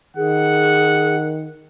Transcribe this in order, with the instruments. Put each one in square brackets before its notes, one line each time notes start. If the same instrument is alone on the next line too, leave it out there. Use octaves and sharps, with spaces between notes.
[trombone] D#3 [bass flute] G#4 [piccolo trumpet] F#5